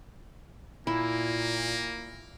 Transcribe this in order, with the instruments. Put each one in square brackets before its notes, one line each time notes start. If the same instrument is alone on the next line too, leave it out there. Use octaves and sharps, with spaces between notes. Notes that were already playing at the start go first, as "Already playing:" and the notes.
[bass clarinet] A#2 [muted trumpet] A#3 [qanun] E4